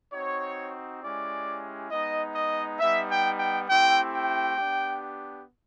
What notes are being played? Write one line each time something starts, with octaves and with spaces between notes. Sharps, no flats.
C4 D#4 F#4 C#5
G#3 C#4 E4 G4 D5
G#3 B3 D#4 D#5
D#5
G3 B3 D#4 E5
G5
G5
A3 C4 E4 G4 G5
G5
B3 D4 G4